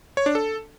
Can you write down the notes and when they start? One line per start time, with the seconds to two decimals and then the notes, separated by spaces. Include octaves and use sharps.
0.17 C#5
0.26 D4
0.35 A4